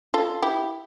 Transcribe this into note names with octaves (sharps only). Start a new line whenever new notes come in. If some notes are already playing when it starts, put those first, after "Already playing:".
F4 A4
E4 G4